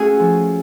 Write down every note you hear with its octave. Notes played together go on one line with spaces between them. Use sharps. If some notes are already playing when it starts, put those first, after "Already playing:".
Already playing: A3 C#4 F#4 G#4 A4
F3